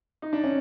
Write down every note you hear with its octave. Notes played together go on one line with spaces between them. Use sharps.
D#4
D4
C#4